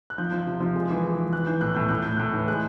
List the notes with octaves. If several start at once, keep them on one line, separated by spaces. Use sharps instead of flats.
F#6
F3 G6
F3
C3
F3
G#3
E3
G#3
E3
E3 F#6
E3 G6
A2 F#6
A2 G6
A2 F#6
A2 G6
A2 F#6
E3
G#3 F#6